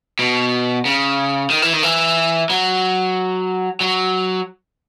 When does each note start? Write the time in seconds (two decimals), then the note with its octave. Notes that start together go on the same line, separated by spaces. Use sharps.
0.19 B2
0.85 C#3
1.50 D#3
1.62 E3
1.73 D#3
1.83 E3
2.50 F#3
3.81 F#3